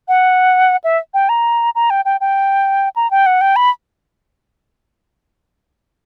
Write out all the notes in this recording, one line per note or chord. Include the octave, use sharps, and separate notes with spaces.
F#5
E5
G5
A#5
A#5
G5
G5
G5
A#5
G5
F#5
G5
B5